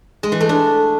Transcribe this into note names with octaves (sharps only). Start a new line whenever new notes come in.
G#3
E3
A3
D4